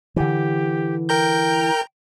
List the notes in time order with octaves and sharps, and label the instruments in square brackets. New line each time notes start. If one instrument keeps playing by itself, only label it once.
[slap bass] D3 E3 [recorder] G4
[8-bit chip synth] A#4 A#5 G6 [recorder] G5